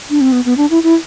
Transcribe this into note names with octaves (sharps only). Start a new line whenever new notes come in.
D4
C4
B3
B3
D4
E4
E4